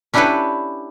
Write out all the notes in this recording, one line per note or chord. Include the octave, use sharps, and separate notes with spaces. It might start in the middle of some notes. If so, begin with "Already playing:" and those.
C#4 D4 E4 G4 A4 B4